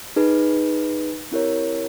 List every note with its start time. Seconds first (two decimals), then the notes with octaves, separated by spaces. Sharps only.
0.16 D#4 G#4 B4
1.31 C4 E4 G4 A#4 C#5